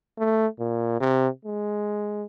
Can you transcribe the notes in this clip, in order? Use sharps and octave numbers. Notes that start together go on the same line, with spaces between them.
A3
A#2
C3
G#3